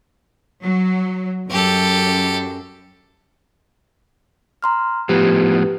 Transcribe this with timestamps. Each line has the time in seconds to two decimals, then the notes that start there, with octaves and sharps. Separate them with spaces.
0.64 F#3
1.50 F#2 G4 A4
4.62 A#5 C6 F6
5.09 A2 F3 B3 G4 B4